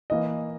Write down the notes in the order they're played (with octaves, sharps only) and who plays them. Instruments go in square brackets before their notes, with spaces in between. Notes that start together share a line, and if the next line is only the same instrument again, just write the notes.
[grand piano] E3 A#3 D#5